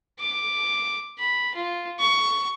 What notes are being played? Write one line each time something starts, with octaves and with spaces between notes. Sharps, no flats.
D6
B5
F4
C#6